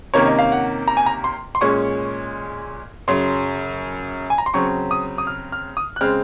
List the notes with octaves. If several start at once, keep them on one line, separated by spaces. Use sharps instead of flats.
C3 D#3 A#3 C#4 C#5
D#5
F5
F#5
A#5
G#5
A#5
C6
C6
A#2 G#3 C#4 C#6
F#2 C#3 F#3 C6
G#5
A#5
C6
C#3 F#3 C4 C#6
D#6
D#6
F6
F6
D#6
F#6
C#3 G#3 C4 F6